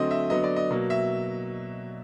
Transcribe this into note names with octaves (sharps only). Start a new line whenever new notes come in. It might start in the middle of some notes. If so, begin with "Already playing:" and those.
Already playing: D3 F#3 A3 C4 D#5
E5
D3 F#3 B3 D#5
D5
D#5
B2 F#3 A#3
E5